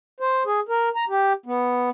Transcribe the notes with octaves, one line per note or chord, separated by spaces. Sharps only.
C5
G#4
A#4
A#5
G4
B3